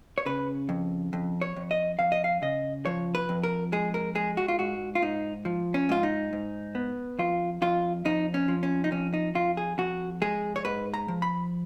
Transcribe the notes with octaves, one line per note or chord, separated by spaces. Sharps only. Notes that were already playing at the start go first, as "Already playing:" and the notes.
C#5
C#3 B4
F2
F2
C#5
F2
D#5
F2 F5
D#5
F5
C#3 D#5
F3 C#5
B4
F2
A#4
G#3 G#4
A#4
G#3 G#4
F#4
F4
G#2 F#4
F4
G#2 D#4
F3
C#4
G#2 F4
D#4
G#2
B3
F2 F4
F2 F4
F2 D#4
C#4
F3
C#4
D#4
F2 C#4
D#4
F2 F4
G#4
F2 F#4
G#3 G#4
C#5
G#2 B4
A#5
F3
B5